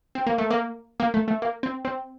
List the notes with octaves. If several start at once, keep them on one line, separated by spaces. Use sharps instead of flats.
C4
A#3
A3
A#3
A#3
A3
A3
A#3
C4
C4